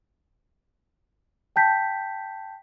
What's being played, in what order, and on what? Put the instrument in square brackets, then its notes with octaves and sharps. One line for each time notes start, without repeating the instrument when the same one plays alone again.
[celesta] G5 A5 G6 B6